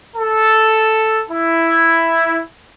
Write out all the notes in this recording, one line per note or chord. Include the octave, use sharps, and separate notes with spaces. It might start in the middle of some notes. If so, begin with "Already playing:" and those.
A4
E4